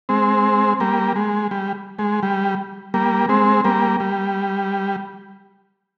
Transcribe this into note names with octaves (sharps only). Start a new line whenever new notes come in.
G#3 C4
G3 A#3
G#3
G3
G#3
G3
G3 A#3
G#3 C4
G3 A#3
G3